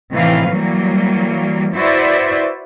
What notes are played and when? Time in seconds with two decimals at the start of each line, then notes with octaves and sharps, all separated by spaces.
0.13 A2 C3 D#3 E3 B4 F5
0.49 E3 F#3 G3 A#3
1.74 E4 F#4 B4 C5 D5 E5